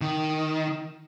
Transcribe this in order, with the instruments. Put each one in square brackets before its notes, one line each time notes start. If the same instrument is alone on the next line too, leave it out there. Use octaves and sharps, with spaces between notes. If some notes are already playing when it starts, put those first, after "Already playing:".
[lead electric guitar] D#3